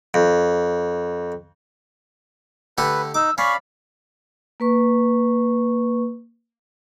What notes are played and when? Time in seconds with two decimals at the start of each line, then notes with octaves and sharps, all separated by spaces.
0.14 F2
2.78 D3 A3 G4 B4
3.14 D#4 D6 E6
3.38 C#4 D5 F5 B5 C#6
4.60 A#3 B4 C#6